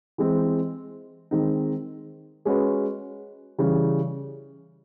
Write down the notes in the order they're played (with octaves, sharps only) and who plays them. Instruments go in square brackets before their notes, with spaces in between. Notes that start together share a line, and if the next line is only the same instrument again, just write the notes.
[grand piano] E3 G#3 C4
D#3 G#3 C4 D#4
G#3 C#4 F#4 B4
C#3 E3 G3